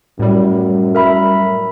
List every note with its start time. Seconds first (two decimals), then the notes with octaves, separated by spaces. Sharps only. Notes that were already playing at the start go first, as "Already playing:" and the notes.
0.19 F#2 A2 G3
0.95 A#4 E5 B5